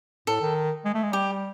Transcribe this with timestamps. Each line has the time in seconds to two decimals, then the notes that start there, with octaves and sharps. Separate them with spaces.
0.27 A2 A4
0.41 D#3
0.85 G#3
0.94 A3
1.03 G#3
1.13 G3 G4